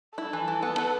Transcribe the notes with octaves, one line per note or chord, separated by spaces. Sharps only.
E4 A4
E3
E3
B3
B4